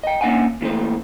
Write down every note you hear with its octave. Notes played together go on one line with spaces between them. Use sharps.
D#5 G5
A#3 C#4 D4 E5 F#5 G#5
A#2 E3 A3 C4